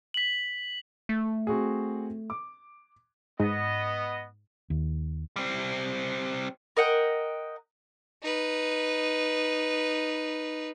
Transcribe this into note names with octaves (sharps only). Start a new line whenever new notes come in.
B6 F#7
A3
C4 F#4 G#4
D6
G#2 B3 D#5
D#2
G3 C4
A#4 D#5 F#5 G5
D#4 B4